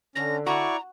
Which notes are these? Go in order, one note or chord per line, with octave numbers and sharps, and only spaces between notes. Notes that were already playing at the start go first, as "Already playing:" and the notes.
D3 C#4 A#6
E4 F#4 D5 A#5 C#6